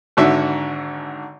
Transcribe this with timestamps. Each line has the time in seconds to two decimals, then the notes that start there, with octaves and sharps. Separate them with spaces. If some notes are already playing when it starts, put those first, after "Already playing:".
0.17 G#1 G#2 D3 F#4 E5